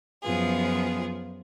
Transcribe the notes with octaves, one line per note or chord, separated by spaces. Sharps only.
F#2 F3 B3 F4 G#4